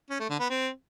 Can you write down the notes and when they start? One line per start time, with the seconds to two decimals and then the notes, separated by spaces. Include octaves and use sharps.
0.10 C#4
0.20 A3
0.30 D3
0.40 B3
0.50 C4